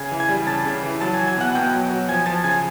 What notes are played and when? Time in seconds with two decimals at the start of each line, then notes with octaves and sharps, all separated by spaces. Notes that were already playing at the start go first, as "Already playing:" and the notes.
Already playing: C#3 G#5 G#6
0.11 E3
0.20 G#5 G#6
0.29 G3
0.47 C#3 A5 A6
0.65 C#3
0.83 E3
1.00 F#3 A5 A6
1.14 G#5 G#6
1.19 F#3
1.28 G#5 G#6
1.37 B2 F#5 F#6
1.55 B2 G5 G6
1.73 F#3
1.90 F#3
2.08 F3 G#5 G#6
2.26 F3 A5 A6
2.44 C#3 G#5 G#6